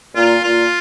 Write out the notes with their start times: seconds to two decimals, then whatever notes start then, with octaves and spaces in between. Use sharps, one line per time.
0.15 A#2 F4
0.44 A#2 F4